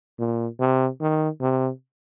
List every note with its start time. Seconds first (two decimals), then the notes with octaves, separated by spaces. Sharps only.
0.19 A#2
0.60 C3
1.01 D#3
1.41 C3